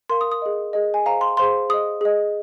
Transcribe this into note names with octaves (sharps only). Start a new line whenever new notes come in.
A#4 F5 C6
D#6
D#6
G#4 D#5
G#4 D#5
G#5
G#4 C5 F5 A#5
C6
G#4 C5 F5 C6
G#4 D#5 D#6
G#4 D#5